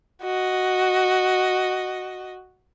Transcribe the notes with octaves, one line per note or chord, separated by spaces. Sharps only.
F#4 D#5